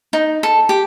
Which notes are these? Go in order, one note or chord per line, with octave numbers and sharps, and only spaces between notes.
D#4
A4
G4